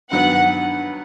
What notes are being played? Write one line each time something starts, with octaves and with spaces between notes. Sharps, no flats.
G2 D#3 F#3 B3 F#5